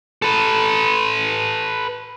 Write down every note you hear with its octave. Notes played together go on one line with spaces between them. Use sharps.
A4 B4